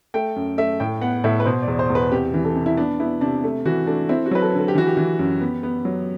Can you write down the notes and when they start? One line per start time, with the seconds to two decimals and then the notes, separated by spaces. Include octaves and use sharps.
0.14 A3 G5
0.36 F#2
0.58 A3 E5
0.80 A2 G5
1.01 B3 F#5
1.24 A2 E5
1.40 B4
1.45 B2 C5
1.62 D5
1.68 E2
1.79 C5
1.90 E2
1.95 B4
2.12 C3 G4
2.34 E3
2.45 A4
2.56 C3
2.66 E4
2.77 B3 D4
3.00 B3 E4
3.21 C3 D4
3.44 A3
3.65 E3 F#4
3.87 A3 D4
4.09 C4 E4
4.26 F#4
4.31 F#3 B4
4.42 A4
4.53 D3
4.58 A4
4.68 G4
4.75 E3 F#4
4.87 G4
4.97 E3
5.19 F#2
5.41 B3
5.63 B3
5.85 F#3